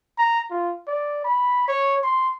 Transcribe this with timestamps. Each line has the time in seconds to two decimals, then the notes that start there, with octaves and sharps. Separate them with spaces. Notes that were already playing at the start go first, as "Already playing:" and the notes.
0.18 A#5
0.51 F4
0.87 D5
1.24 B5
1.68 C#5
2.03 C6